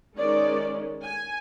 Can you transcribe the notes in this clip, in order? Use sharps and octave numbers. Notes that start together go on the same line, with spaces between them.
D#3 G#3 C#4 D5
G#5